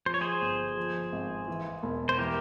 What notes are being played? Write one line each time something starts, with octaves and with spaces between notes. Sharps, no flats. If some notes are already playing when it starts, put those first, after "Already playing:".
F3 C5
C#5
G#4 C5
G1
F3
G#1
E3
E1
C5
E3 G4 A#4